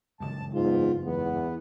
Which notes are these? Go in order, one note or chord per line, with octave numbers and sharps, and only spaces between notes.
F#1 C#2 G2 A5
E2 G#2 F4
E2 B3